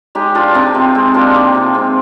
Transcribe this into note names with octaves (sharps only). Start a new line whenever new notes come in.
G#3 D#4 G4
F3 D4 F4
C3 C4 D#4
C3 C4
G#3 C4
F3 A#3 D4
C3 C4 D#4
C3
G#3 C4